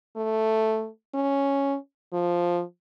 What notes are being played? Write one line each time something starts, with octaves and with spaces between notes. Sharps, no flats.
A3
C#4
F3